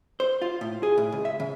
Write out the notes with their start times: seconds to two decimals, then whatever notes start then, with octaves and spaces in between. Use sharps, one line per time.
0.20 C5
0.42 F4
0.61 A2
0.83 G#4
0.98 A2
1.12 C#2
1.25 E5
1.40 C#3